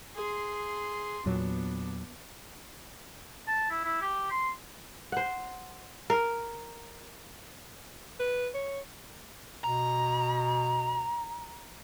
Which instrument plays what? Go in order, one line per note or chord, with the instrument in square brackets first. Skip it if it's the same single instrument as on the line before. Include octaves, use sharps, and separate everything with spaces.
[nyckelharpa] G#4 C6
[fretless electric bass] E2 A#2 F#3 [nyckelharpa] B3 D4
[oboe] A5
E4
E4
G4
C6
[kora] C5 F#5
A#4
[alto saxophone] B4
C#5
[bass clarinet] B2 [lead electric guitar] A#5